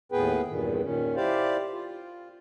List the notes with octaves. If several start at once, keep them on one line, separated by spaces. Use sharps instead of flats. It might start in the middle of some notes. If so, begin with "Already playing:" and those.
D#2 A2 B3 G#4 B4 G5
E2 G2 A#2 D#3
A#2 D#3 C#4
E4 G4 C5 D5 F5
F4